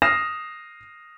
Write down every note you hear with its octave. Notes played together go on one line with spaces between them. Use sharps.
D#6 F6 A#6 C7 E7